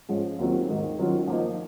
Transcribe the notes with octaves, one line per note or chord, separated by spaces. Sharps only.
G#2 F3 G#3 C#4
D#2 D#3 F#3 C4 F4
G#2 D#3 G#3
D#3 F#3 C#4 F4
F3 A#3 D#4